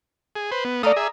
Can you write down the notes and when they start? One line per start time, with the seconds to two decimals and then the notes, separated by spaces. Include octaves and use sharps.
0.36 G#4
0.51 B4 C5
0.65 B3
0.83 A3 D5 F5 A#5 D#6
0.96 G#4 E5